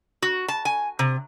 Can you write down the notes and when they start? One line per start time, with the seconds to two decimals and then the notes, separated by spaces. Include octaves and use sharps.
0.22 F#4
0.48 A5
0.65 G#5
0.99 C3